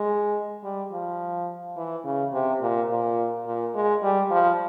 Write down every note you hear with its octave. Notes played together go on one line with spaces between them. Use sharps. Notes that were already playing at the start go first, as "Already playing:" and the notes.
Already playing: G#3
G3
F3
E3
C#3
C3
A#2
A#2
A#2
G#3
G3
F3